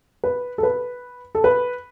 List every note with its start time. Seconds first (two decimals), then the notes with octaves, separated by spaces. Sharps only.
0.24 B4
0.58 A4
0.63 B4
1.35 A4
1.44 B4